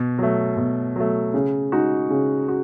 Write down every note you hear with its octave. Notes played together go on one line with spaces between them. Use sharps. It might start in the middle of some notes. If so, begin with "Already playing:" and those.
Already playing: B2
F#3 A3
B2
F#3 A3
C#3
G#3 D#4 F#4
C#3
F#4